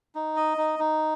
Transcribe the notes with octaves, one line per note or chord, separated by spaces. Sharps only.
D#4
D#5
D#4
D#4